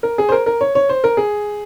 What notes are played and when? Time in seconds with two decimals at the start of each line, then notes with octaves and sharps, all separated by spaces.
0.03 A#4
0.18 G#4
0.29 C5
0.32 A#4
0.46 A#4
0.61 C#5
0.75 C#5
0.89 C5
1.04 A#4
1.17 G#4